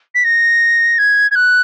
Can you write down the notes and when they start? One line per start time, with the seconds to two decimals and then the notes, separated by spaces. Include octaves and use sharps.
0.15 B6
0.24 A#6
0.98 G#6
1.31 G#6
1.35 F#6